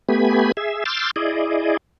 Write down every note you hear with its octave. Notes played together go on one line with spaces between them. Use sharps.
A3 B3 G4 G#5 B5
G#4 E5
C6 D6 E6 F6 G6 A6
E4 G#4 D5 D#5